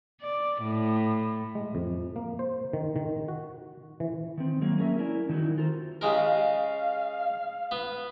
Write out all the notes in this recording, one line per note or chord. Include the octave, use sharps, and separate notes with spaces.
D5
A2
G#3
F2
A#3
C5
D#3
D#3
F#4
E3
D#3 C4
F#3 G#3 A#3
C#4 G#4 A#4 E5
C#4 E4 A#4 D5 G#5
D#3 F#3 D#4 E4 F#4
F4 A4 A#4 C5
C#3 G#3 G4 A#4
F5
B3